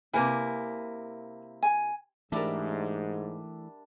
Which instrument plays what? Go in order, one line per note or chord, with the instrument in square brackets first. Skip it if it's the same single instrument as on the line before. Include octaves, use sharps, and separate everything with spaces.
[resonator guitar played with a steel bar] C3 A#3 E4 [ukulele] B4 G#5
[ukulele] G#5
[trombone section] G#2 [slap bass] E3 A3 [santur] G3 D4 [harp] A#4 D5 E5